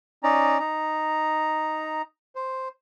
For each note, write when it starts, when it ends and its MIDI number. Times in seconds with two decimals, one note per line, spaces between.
0.23 0.59 61
0.23 0.59 63
0.23 0.59 74
0.23 0.59 82
0.59 2.02 63
0.59 2.02 82
2.35 2.68 72